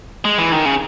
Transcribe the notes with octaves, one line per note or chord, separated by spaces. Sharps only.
G#3
E3
D#3
C#3